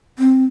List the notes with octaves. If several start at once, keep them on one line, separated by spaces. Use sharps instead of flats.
C4